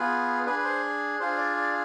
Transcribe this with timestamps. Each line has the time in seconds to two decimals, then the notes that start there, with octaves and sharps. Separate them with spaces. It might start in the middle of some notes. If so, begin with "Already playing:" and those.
Already playing: B3 F4 G#4 B4
0.46 D4 G#4 B4
0.59 B4
0.64 C5
1.20 D4 F4 G#4 C5
1.38 D5
1.57 D5